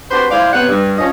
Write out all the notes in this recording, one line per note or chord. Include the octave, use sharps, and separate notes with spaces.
C4 D4 F#4 G4 B4 C5
G#3 E4 G#4 C5 D5 F5
C3 B3 C#5 F#5
G2
F3 C#4 D#5